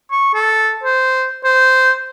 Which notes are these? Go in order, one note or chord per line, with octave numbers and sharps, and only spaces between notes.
C#6
A4
C5
C5